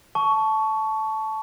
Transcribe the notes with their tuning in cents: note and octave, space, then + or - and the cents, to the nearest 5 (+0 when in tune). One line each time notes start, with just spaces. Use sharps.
A5 -10 C#6 +15